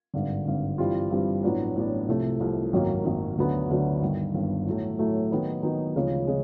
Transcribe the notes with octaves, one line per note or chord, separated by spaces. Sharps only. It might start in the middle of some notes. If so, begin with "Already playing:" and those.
G#1 G2 D3
G#1 G2 D3
G2 E3 G3 C4 F4
G2 E3 G3 C4 F4
A1 A2 F#3 B3 D4
A1 A2 F#3 B3 D4
C2 C3 F3 A3
C2 C3 F3 A3
G#1 F#2 D#3 F#3 A#3
G#1 F#2 D#3 F#3 A#3
D2 D3 F#3 B3
D2 D3 F#3 B3
G1 G2 D#3
G1 G2 D#3
A2 F#3 A3
A2 F#3 A3
D#3 F#3 B3 D#4
D#3 F#3 B3 D#4
D2 C#3 F3 G#3
C#3 F3 G#3